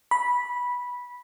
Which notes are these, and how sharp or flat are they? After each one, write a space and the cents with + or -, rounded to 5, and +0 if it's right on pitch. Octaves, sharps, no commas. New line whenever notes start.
B5 -10